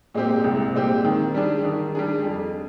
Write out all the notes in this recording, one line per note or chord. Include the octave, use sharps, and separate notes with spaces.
A#2 G#3 C4 G4
C2
A#2 G#3 C4 G4
D#3
G3 D4 G#4
D#3
G3 D4 G#4
F2